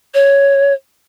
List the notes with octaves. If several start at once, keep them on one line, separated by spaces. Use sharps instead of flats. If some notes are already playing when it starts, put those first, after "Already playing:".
C#5